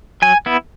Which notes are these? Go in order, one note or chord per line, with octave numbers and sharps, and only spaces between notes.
F#3 G#5
B3 E4